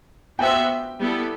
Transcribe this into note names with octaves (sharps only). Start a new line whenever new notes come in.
B3 F#4 C5 E5 G5
G3 B3 E4 A4